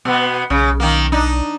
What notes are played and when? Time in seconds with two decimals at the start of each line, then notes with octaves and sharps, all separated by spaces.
0.05 B2 B3
0.50 B1 C#3
0.80 D#3 A#3
1.12 D4 D#4